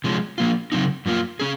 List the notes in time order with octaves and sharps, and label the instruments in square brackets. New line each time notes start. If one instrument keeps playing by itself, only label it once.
[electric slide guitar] C3 F3 G#3 C#4
F3 A#3 F4
C#3 F#3 C4 D#4
F#2 F3 A#3 F4
C#4 G#4